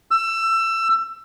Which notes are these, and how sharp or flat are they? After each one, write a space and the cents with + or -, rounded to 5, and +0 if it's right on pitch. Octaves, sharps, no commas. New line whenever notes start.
E6 +20